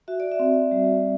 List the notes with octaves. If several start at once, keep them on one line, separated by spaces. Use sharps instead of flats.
F#4 E5
D5
E5
C4
G3